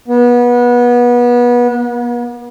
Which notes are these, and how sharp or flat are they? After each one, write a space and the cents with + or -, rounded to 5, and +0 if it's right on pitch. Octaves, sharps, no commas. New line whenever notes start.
B3 -25
B3 -45